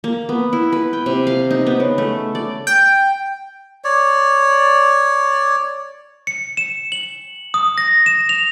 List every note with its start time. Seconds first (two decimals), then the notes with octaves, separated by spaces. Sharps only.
0.04 A#3
0.29 B3
0.53 E4
0.72 B4
0.93 G5
1.06 C3
1.27 F5
1.51 D#4
1.66 B3
1.80 C#3
1.98 A3
2.35 D5
2.67 G5
3.84 C#5 D5
6.27 C#7
6.57 E7
6.92 F#7
7.54 D#6
7.78 A#6
8.06 E7
8.29 F7